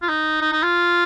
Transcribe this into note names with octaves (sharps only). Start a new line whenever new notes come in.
F4
D#4
D#4
D#4
F4